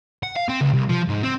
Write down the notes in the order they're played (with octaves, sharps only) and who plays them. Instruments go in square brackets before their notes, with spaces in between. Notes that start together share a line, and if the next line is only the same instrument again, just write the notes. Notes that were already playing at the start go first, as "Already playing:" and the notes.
[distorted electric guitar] F#5
F5
C4
C#2
C2
F3
G#2
C4